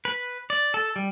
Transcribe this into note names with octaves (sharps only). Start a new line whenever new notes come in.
B4
D5
A4
G3